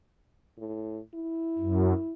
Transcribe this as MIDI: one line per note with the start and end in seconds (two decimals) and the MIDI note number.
0.58 0.99 45
1.14 2.13 64
1.58 1.93 42